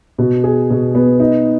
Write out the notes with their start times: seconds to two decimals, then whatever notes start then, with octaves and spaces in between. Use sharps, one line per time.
0.18 B2
0.44 G#4
0.70 B2
0.95 B3
1.20 D#4